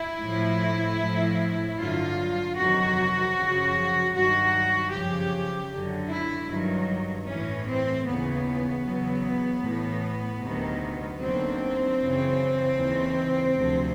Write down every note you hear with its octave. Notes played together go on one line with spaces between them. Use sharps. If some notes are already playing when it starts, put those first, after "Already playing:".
Already playing: E4
A2 F3
A2 F3
G2 D3 F#3 F4
F2 C3 D#3 F#3 F#4
F#2 C#3 F3
G2 D#3 F#3 F#4
F#2 C#3 F3 G4
F#2 D3 F#3
E4
G2 D#3 F#3
A2 E3 C#4
C4
D#2 C#3 E3 B3
E2 C#3 F#3
A2 E3
D2 C3 D#3 F#3
D#2 D3 F#3 C4
F#2 C#3 E3
D#2 C#3 E3
D2 C3 F3